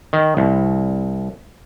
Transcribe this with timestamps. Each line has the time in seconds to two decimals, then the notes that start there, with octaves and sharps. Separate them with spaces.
0.13 D#3
0.37 C2